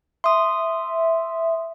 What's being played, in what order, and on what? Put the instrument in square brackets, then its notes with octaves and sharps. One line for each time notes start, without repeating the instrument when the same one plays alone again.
[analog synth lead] E5 [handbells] C6 D#6